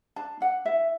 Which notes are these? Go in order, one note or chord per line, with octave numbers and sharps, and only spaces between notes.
D4 A5
D4 F#5
E4 E5